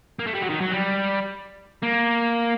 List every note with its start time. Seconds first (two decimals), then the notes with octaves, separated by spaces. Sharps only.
0.19 A#3
0.27 A3
0.35 G3
0.42 F#3
0.50 D#3
0.61 F#3
0.71 G3
1.83 A#3